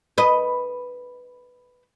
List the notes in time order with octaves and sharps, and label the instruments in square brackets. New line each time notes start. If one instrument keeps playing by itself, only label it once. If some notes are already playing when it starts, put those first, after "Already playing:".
[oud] B4 D#5